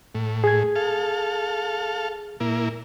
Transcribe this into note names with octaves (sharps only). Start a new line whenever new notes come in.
A2
G#4 G#6
A4 F5
A#2 A#3 E4